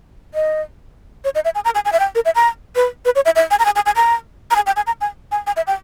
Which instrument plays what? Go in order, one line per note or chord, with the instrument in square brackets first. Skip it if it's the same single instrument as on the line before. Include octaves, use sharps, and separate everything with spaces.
[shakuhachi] D#5
C#5
D#5
E5
G#5
A#5
G#5
G#5
E5
G5
A#4
E5
A#5
B4
B4
C#5
E5
E5
G#5
A#5
G#5
G#5
G#5
A#5
A#5
G#5
G5
G#5
A#5
G#5
G#5
G#5
E5
G5